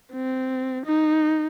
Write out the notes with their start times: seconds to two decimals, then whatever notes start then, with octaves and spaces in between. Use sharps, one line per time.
0.12 C4
0.86 D#4